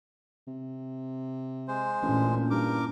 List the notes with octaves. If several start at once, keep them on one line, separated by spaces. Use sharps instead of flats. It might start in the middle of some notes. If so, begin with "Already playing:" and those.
C3
G#3 C5
A1 A#2 C#4 D4 E4
G2 A#4 D6